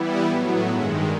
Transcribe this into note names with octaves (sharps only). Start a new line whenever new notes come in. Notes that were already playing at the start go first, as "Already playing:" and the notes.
Already playing: E3 G3 B3 E4
A2 F#3 B3
G2 D#3 G#3 E5 F#5